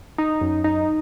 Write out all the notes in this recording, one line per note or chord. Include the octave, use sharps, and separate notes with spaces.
D#4
F#2
D#4